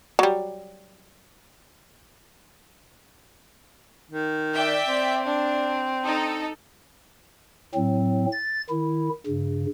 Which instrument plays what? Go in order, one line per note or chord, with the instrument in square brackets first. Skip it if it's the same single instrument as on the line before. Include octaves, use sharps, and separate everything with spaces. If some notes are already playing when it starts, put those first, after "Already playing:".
[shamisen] F#3 G3
[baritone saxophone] D#3
[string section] D5 E5 G5
[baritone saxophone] C4
[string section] D4
D#4 A4
[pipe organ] A2 F#3 C4
A6
D#3 E4
G2 C#3